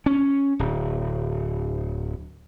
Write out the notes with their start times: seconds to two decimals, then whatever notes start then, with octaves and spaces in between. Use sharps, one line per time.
0.06 C#4
0.59 D1